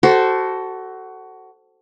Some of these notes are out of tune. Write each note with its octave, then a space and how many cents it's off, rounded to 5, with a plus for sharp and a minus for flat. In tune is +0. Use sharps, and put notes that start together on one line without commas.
F#4 +20 A4 +0 C5 +0